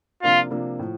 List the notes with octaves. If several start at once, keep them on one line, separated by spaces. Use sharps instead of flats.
C3 F3 A#3 D4 F4
C3 F3 A#3 D4
A2 F3